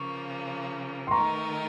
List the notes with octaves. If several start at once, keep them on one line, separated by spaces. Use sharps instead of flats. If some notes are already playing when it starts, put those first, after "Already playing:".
Already playing: C#3 F3 A#3 C#6
C6
D#3 A3 D#4 A#4 A#5 C#6